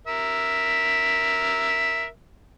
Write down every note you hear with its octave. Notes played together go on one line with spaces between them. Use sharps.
A#4 E5